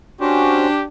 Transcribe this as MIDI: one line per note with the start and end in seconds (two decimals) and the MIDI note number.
0.21 0.67 61
0.21 0.87 62
0.21 0.67 66
0.21 0.84 67
0.21 0.67 72